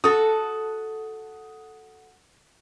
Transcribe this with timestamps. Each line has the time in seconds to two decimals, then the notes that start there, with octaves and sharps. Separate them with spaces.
0.04 F#4 A4 D#6